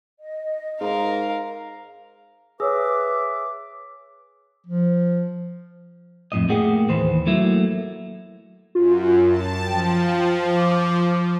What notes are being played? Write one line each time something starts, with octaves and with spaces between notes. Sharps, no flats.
D#5
G#2 A#4 F5
G#4 B4 C#5 E5 D6 E6
F3
F2 A2 D#5
A2 A3 A#3 G4 G#4 F#5
D#2 E3 B4 C5
F#3 A3 A#3 E4
F#2 F4
A5
F3 G5
D6